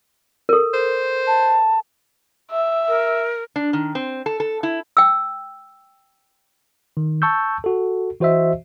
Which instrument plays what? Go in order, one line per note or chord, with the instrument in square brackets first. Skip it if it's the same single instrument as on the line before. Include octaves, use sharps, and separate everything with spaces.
[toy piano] A4 A#4
[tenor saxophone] C5
[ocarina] A5
[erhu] E5
[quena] A#4
[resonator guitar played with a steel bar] D4
D#3
C4
A4
A4
E4
[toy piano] G5 E6
[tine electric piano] D#3
A5 C#6 E6 G6
F#4 A4
E3 F#4 C5 D#5 E5